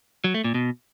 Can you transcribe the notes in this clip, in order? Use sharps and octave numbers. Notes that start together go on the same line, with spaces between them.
F#3
A3
A#2
B2